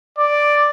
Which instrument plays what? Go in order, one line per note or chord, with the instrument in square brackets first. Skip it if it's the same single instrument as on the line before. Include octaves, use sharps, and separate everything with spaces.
[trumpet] D5